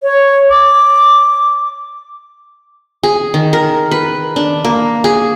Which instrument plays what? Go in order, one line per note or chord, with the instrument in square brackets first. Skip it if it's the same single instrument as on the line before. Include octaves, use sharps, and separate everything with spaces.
[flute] C#5
D6
[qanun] G#4
D#3
A#4
B4
D4
A#3
G#4